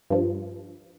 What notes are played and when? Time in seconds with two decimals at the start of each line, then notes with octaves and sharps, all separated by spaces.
0.10 G2 F3